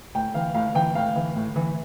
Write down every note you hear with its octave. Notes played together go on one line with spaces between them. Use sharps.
A2 G5
E3 F5
A2 F5
E3 G5
A2 F5
E3
A2
E3